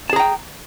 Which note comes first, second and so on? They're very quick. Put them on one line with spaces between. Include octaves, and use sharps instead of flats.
A5 G#4 A#5 G5